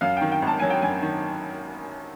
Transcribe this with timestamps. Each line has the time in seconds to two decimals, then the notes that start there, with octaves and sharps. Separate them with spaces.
0.01 F#2 F5
0.17 D#3 G5
0.32 G5
0.42 G#1
0.47 A5
0.59 F#3 G#5
0.70 G5
0.82 F#2 G#5
1.02 D#3